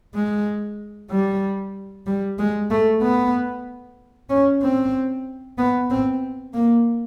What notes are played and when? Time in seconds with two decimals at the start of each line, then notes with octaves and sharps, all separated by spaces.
0.14 G#3
1.10 G3
2.06 G3
2.38 G#3
2.70 A3
3.02 B3
4.30 C#4
4.62 C4
5.58 B3
5.90 C4
6.54 A#3